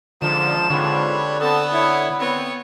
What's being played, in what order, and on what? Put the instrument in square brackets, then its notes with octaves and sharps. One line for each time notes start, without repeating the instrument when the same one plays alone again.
[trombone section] C#2 F3 [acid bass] D3 [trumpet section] D#4 C5 A5 [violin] E7
[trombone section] G#2 C4 F4 [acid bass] D3 [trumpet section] G3 B4 C#5
[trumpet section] B3 [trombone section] C4 A4 [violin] A5
[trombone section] E4 [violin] C#5
[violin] B3 C#5 [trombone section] C4